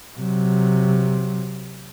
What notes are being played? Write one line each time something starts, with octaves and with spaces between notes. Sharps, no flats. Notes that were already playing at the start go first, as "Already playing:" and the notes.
C3 F#3